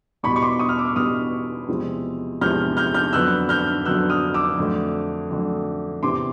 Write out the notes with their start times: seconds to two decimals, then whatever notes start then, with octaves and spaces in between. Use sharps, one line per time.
0.23 E2 B2 G3 B5 C#6
0.36 C#6
0.42 C6 D6
0.59 C#6 D#6
0.69 F6
0.77 D6 E6
0.96 E2 B2 G3 D#6 F6
1.68 E2 C3 F3 G#3
2.41 E2 C3 F3 G#3 F6 G6
2.77 F6 G6
2.95 F6 G6
3.13 F2 D3 F#3 B3 E6 F#6
3.49 F6 G6
3.85 F2 D3 F#3 B3 E6 F#6
4.10 D#6 F6
4.34 D6 E6
4.58 F2 D3 F#3 A3
5.31 F2 D3 F#3 A3
6.02 E2 C3 E3 C6 D6